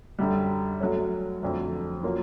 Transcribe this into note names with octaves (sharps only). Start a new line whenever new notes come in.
F#2 D3 G3
F#3 A3 C#4
F2 D3 F#3 A3
F#3 A#3 C#4 F4